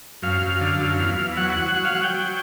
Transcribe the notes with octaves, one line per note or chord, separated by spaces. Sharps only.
F#2 F5
F#2
D3
F#2
E2
E2
F#3 F#5
F#5
F#3
F#5
F#3 F#5
F5
F#3 F#5
G5
F#3